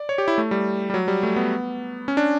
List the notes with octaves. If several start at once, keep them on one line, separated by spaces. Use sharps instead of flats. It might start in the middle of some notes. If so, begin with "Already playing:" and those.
Already playing: D5
C#5
G4
E4
A3
G3
G3
F#3
G3
A3
B3
C#4
D4